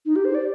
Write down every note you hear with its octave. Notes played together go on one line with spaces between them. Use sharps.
D#4
G4
C5
D5